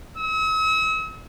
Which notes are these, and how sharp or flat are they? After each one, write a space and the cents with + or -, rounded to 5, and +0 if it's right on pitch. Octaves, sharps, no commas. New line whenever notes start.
E6 -45